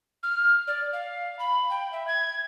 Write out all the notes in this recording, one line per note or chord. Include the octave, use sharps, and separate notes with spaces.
F6
D5
F5
B5
G5
E5
G#6